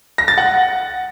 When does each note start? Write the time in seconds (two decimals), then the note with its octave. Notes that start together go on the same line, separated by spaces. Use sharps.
0.18 A#6
0.28 A6
0.38 F#5